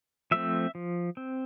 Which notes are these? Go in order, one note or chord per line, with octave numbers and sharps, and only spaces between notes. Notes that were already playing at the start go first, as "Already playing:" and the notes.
F3 A3 C4 E5
F3
C4